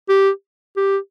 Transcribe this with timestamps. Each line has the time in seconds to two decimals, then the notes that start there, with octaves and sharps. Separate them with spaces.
0.09 G4
0.77 G4